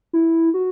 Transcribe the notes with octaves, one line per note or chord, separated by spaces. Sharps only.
E4
F#4